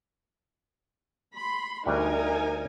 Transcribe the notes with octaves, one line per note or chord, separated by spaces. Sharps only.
B5 C6
D2 G3 D#4 A#4 F#5 G#5